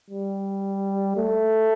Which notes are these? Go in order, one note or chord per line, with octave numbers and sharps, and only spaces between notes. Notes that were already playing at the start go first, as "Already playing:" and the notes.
G3
A3